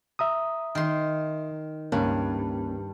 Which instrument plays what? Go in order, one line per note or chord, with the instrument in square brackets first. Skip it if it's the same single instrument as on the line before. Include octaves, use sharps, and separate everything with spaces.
[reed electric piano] E5 A#5 D#6
[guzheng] D#3 C6
[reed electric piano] C#2 A#3 C#4 [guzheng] G2